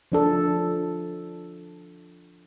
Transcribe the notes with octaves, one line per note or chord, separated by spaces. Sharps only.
F3 D4 A4